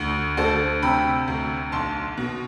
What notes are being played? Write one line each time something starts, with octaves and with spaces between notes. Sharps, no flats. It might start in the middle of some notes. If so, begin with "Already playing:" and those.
Already playing: D2
D2 A4 C5
C3 G5 B5
D2
B1 A5 C6
B2